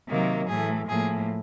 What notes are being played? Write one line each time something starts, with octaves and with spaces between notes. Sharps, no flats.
C3 D#3 F#3 A#3
A2 E3 A3 G#4
A2 F3 A#3 G#4